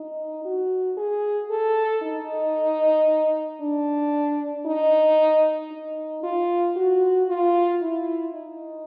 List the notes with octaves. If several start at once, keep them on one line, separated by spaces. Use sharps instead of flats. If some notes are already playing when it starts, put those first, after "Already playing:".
Already playing: D#4
F#4
G#4
A4
D#4
D4
D#4
D#4
F4
F#4
F4
E4
D#4